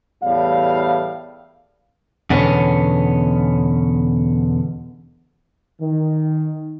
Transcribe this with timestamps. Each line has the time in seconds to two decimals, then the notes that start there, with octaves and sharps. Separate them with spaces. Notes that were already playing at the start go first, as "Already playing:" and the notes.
0.22 E2 A2 G3 F5
2.30 E2 B2 D3 B3 C#4
5.81 D#3